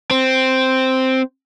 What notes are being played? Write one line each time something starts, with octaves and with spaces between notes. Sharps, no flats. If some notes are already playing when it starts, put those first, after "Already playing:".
C4